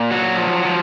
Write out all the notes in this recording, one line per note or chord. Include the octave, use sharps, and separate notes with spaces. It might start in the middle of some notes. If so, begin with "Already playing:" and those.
Already playing: A#2
F#3 F#4
F3
F3